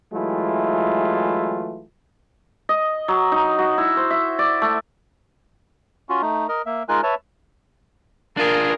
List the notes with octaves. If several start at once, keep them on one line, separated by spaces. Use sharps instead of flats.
E3 F#3 G#3 A3 E4 F4
D#5
F#3
D#4
F#4
E4
C5
E5
D5
A3
C#4 F4 F#4
A3 D#4
A#4 D#5
A#3 E5
G#3 D#4 F4 A#4 G#5 F#6
B4 C#5 E5 A5
D4 F4 G#4 A#4